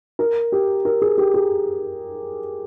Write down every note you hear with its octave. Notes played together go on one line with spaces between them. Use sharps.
A#4
G4
A#4
G#4
G4
G#4